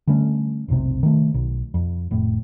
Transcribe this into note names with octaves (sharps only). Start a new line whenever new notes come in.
D3 G3 A3 C#4
F1 B1 C3
D#3 A3
B1
F2
F1 A2